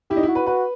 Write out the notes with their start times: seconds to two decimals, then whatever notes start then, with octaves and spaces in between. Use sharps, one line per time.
0.10 E4 G4
0.17 D#4
0.23 E4
0.28 F#4
0.35 B4
0.46 F#4 B4